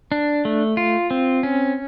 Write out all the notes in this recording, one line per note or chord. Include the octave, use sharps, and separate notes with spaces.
D4
A3
F4
C4
C#4